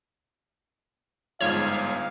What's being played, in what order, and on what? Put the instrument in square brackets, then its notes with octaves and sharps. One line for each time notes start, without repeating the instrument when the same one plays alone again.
[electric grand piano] G1 G#2 F3 [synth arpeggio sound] C#5 [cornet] F5